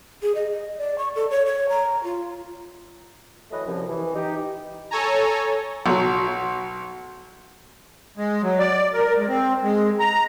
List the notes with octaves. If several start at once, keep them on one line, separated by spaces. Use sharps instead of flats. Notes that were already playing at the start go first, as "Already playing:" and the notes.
G#4
D#5
D#5
D5
C#6
A4
C#5
C#5
A#5
F4
E3 F#3 A3 B4 D#5
C2 F#2 F3
E3
D#4 G4
A4 C#5 G#5 A#5
B1 F#3
G#3
F#3
D5
A#4
G#3
C4
G#3
A#5